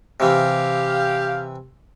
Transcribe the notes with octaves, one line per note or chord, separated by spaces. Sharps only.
C3 E3 G4 F5